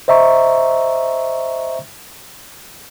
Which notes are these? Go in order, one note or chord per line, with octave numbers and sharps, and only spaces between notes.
C5 D#5 E5 A#5 C#6